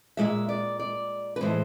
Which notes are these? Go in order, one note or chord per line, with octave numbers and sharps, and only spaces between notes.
A#2 F3 G#3 E5
D5
D5
B4
A2 E3 G#3 C5